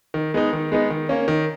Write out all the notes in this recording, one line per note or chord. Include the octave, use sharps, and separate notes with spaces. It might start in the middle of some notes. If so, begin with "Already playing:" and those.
D#3
G#3 B3 D#4
D#3
G#3 B3 D#4
D#3
A#3 C#4
D#3